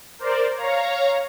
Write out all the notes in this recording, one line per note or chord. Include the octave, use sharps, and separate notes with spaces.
A#4 C5 D5
C#5 F5 A#5